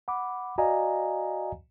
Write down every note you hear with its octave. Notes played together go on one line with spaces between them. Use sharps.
F#5 B5 D6
F#4 D5 D#5 F5 G#5 A#5